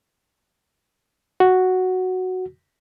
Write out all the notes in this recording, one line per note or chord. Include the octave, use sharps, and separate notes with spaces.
F#4